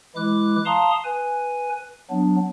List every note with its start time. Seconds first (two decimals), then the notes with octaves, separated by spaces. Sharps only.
0.16 E3 G#3 E4 D6 F#6
0.66 F5 A5 A#5 C6 D#6
1.04 B4 G#5
2.10 F#3 B3 D4